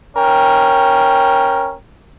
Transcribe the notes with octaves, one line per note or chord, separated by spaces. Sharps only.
C#4 A#4 G5